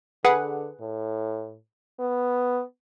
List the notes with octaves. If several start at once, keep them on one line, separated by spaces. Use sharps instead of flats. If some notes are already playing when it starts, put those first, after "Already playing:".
D3 G#4 B4 F#5
A2
B3